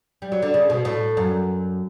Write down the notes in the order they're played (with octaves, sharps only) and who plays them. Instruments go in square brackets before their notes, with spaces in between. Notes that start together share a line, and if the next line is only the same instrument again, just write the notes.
[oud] G3
F#3
D3
C#3
B2
A2
F#2